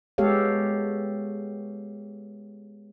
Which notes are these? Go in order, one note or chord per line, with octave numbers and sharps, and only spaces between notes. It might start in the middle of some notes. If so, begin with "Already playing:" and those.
G#3 B3 G4 A4 C#5 F5